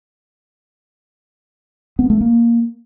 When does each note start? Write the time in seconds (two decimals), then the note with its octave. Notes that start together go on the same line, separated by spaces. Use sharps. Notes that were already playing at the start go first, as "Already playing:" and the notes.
1.99 B3
2.10 A3
2.21 A#3